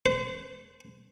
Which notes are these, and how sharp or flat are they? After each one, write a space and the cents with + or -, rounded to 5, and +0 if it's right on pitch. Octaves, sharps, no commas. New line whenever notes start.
C5 -35